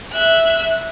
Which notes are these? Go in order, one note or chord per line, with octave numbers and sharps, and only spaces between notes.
E5 F#6